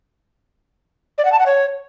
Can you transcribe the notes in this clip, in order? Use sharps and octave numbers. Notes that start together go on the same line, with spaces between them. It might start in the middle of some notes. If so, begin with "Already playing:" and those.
D5
F#5
A5
F#5
C#5